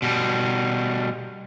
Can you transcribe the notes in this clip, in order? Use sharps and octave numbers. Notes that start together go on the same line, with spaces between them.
B2 G3